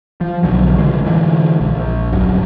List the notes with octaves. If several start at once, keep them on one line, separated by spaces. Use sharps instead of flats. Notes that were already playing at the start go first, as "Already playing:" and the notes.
F3
B1 D3 F#3
A1 C#3 G#3
D3 E3 F#3 G#3
A#1
D1 G2 F#3